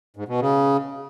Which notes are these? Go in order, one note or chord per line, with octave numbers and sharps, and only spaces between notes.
G#2
B2
C#3